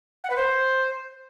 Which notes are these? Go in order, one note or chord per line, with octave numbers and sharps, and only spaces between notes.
F#5
B4
C5